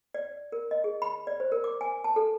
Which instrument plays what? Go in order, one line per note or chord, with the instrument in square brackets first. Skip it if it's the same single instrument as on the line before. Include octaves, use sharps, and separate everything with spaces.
[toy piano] D5
A#4
D#5
G#4
B5
D5
C5
A#4
D6
G#5
A5
A4